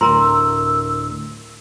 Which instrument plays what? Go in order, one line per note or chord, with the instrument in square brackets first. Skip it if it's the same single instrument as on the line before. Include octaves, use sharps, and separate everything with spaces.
[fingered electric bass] D2 A2 [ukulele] A#4 [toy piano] A#5 C6 [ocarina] E6